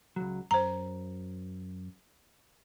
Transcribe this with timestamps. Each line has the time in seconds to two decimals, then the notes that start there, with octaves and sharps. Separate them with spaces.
0.16 C#2 F#3
0.51 F#2 C5 A#5